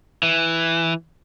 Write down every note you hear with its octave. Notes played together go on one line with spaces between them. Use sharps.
E3